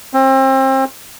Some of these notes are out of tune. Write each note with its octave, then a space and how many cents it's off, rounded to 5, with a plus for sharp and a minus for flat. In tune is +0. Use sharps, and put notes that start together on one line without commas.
C4 +30